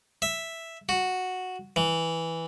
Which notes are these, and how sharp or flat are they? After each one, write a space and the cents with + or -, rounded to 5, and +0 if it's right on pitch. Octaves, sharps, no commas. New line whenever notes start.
E5 +0
F#4 -5
E3 -5